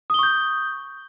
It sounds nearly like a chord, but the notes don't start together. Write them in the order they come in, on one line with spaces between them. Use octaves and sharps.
D#6 G7 C#6 G6